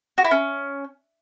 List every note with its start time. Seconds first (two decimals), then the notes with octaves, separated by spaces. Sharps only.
0.18 F#4
0.25 E4
0.31 C#4